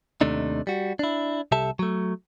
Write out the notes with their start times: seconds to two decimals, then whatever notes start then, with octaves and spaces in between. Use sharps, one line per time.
0.21 D#2 C3 A3 D4 D#4
0.67 G3 F#4
0.99 D4 E4
1.52 C2 C3 G4 A4 E5 A5
1.79 F#3 A3